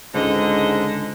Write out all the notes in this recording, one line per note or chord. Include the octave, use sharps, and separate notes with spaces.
C#2 G#2 D3 D#5